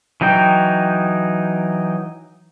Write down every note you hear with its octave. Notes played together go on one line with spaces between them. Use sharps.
E3 F#3 D#4 G5